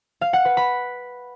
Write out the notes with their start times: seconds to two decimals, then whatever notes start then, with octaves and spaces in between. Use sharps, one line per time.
0.21 F5
0.33 F#5
0.45 B4
0.57 B5